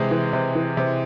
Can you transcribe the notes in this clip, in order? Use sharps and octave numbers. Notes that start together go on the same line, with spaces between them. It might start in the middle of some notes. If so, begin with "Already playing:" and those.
Already playing: C3 E3 G#3
E3
C3
E3
C3